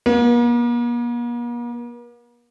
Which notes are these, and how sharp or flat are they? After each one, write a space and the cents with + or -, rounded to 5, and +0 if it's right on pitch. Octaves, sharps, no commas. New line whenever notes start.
A#3 +45